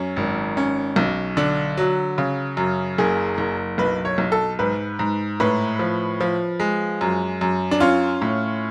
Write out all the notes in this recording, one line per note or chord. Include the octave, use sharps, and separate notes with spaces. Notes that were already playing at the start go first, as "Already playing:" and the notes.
Already playing: F#2 C#4
G#1
C#4
B1
D3 D4
F#3
C#3
F#2
F#1 G#4
F#1
B1 B4
C#5
B1
A4
G#2 B4
G#2
A2 B4
F3
F3
G#3
F#2
F#2
D4
C#4 F4
A2